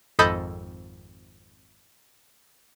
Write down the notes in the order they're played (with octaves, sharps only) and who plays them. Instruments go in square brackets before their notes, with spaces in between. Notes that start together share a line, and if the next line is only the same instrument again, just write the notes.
[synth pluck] G#1 F2 A4 D#5 B5 G6